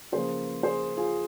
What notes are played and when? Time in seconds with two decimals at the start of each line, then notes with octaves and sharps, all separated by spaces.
0.12 C#3 F3 A#3 G#4 C5
0.63 G#4 C5
0.97 F4 G#4